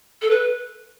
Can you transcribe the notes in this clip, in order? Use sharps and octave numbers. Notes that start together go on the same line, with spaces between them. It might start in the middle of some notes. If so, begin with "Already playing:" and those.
A4
B4